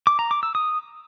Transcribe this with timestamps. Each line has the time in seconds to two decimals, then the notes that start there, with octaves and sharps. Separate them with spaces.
0.07 D6
0.19 A#5
0.31 D6
0.43 E6
0.55 D#6